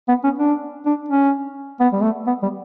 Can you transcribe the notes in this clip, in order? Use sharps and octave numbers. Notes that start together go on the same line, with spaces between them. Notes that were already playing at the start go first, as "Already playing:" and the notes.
B3
C#4
D4
D4
C#4
B3
G3
A3
B3
G3